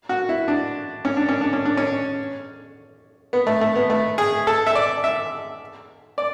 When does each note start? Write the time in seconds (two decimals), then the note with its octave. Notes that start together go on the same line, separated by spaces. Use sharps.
0.09 F#4
0.29 E4
0.48 D4
1.05 C#4
1.17 D4
1.29 C#4
1.41 D4
1.53 C#4
1.65 D4
1.77 C#4
3.33 B3
3.47 A3
3.61 A3
3.76 B3
3.90 A3
4.18 G#4
4.47 A4
4.67 E5
4.75 D5
5.04 E5
6.18 D5